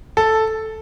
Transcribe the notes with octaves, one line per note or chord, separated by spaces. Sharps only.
A4